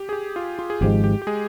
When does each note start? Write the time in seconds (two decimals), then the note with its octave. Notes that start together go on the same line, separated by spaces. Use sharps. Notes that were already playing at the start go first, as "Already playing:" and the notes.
Already playing: G4
0.09 G#4
0.13 G4
0.36 F4
0.59 F4
0.70 G#4
0.81 G#1 G#2 F3 G#3 G4
1.04 G4
1.22 G4
1.27 G#3 G#4